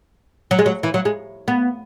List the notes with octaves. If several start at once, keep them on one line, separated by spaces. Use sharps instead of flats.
F#3
G#3
F#3
E3
F#3
G#3
B3